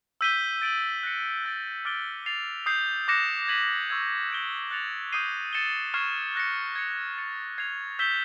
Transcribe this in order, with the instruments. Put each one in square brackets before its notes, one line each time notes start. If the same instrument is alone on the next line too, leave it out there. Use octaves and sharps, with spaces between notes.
[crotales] E6 G6 B6 D#7 G7
A6 D7 F#7
F#6 A#6 C#7
F#6 A6 D7
D6 F6 A6 D7 G7
A6 C7 F7
D#6 G6 C7
D6 F#6 A#6 C#7 E7
G#6 B6 D#7 F#7
C#6 E6 G#6
G6 A#6 D7 G7
F#6 A6 C#7 F7
D#6 G6 C7 D#7 G7
A6 C#7 E7 G7
C#6 F6 G#6 C7 E7
F#6 A#6 C#7
G#6 C#7 F7
A6 C#7 E7
G#6 C7 F7
E6 G6 B6 E7 G7